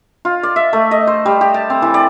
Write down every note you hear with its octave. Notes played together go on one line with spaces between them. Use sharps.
F4
D5
E5
A3
D#5
C5
G3
G4
A5
C4
E3
D5